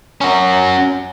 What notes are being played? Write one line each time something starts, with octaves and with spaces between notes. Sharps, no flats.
C#4 F#4